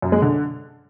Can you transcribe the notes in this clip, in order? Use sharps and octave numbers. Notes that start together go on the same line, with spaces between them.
F#2
G#3
D3